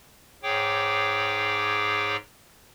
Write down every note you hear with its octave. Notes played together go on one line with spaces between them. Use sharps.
G#2 G#4 C#5 G5 D6